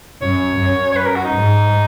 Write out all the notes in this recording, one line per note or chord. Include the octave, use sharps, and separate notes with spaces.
F#2 C#5
F#2
C#5
B4
A#4
F#4
D#4
G#2